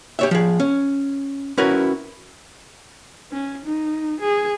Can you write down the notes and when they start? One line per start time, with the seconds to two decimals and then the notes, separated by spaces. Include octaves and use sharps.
0.19 G4 C#5 E5
0.31 F3 G#4
0.60 C#4
1.58 C#4 E4 F#4 A#4 B4
3.32 C#4
3.65 D#4
4.20 G#4